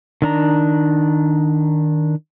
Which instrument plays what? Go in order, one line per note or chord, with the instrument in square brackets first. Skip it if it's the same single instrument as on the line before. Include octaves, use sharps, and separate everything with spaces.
[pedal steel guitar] D#3 D4 A#5